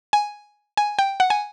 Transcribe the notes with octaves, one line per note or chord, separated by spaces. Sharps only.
G#5
G#5
G5
F#5
G#5